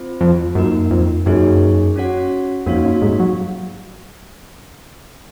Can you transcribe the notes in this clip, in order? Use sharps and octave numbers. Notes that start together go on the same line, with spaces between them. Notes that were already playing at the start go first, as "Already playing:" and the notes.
Already playing: C4 F4 C5
F2
F#2 A#3 D#4 A#4
F2
F#2 A#3 D#4 G#4 C#5
C#4 F#4 C#5 F#5
F2 A#3 D#4 F#4 C#5 F5
F#2
G#2
F#3